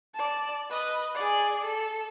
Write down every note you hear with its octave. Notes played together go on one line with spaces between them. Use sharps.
D5 A5
B4 D#5
G#4 D5
A4